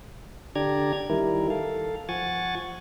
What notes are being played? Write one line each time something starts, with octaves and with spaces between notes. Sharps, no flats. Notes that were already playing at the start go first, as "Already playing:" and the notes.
D3 D4 G4 D5 A#5 G#6
D#3 G3 E4 A#4
A4 F5
F3 F#5 G#5 C#6 A6